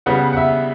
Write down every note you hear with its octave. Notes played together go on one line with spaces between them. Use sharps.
C#3 G3 B3 F#5
F#5
E5